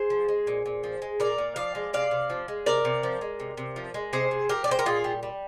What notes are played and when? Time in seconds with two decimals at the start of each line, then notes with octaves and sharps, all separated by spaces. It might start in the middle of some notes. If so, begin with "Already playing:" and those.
Already playing: G#4 C5
0.10 F3
0.29 G#3
0.47 A#2
0.66 A#2
0.84 F3
1.02 G#3
1.20 A#2 A#4 D5
1.38 A#2
1.56 F3 D5 F5
1.75 G#3
1.93 C3 D5 F5
2.11 C3
2.30 F3
2.48 G#3
2.66 C3 A#4 D5
2.85 C3
3.03 F3
3.21 G#3
3.40 C3
3.57 C3
3.76 F3
3.94 G#3
4.13 C3 G#4 C5
4.31 C3
4.49 F3 G4 A#4
4.64 D5
4.67 G#3 C5
4.79 A#4
4.86 A#2 F4 G#4
5.04 G3
5.23 G3